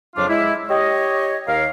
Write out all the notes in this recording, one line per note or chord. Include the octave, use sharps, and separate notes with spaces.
F2 C#3 F#3 D4 F4 D6
G#3 E4
G4 C#5 D#5
D#2 A#4 F5